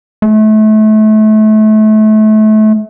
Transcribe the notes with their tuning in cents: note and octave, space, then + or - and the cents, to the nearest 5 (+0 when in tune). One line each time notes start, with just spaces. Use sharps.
A3 -30